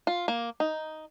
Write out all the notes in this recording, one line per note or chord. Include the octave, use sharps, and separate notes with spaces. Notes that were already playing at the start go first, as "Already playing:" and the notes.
F4
A#3
D#4